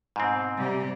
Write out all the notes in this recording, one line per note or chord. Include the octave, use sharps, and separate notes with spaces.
G#2 B2 C4
C3 G3